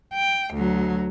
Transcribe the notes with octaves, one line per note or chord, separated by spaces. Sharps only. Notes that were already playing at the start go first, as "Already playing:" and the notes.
G5
D2 F#3